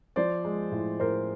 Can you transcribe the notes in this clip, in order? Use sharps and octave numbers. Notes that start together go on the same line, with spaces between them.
F3 C5 D5
G#3
A2
A2 A#4 C5